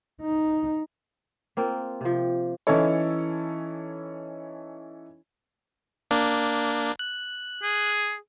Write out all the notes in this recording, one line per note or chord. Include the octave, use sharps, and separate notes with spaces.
D#4
A#3 C4 F4
C3 F3
E3 C#4 D#4 E4 A4 C#5
A#3 D4
F#6
G#4